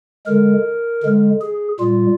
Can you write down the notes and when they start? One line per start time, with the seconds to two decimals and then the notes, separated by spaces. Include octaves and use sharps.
0.26 D3 G#3 A#4
1.03 D3 G#3
1.41 G#4
1.80 A#2 G3 F4